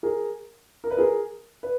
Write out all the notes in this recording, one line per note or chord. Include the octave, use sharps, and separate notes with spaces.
G#4 A#4
A#4
B4
G#4 A#4
B4